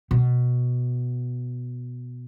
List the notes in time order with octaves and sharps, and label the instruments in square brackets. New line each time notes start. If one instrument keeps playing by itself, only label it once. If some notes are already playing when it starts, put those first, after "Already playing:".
[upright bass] B2